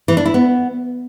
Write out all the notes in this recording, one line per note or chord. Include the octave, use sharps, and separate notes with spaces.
E3
D4
E4
B3